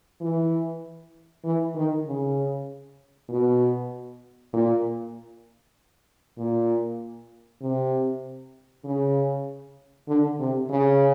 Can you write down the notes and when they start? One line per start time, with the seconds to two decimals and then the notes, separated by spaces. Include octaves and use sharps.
0.21 E3
1.44 E3
1.75 D#3
2.06 C#3
3.30 B2
4.53 A#2
6.38 A#2
7.62 C3
8.85 C#3
10.08 D3
10.40 C3
10.70 C#3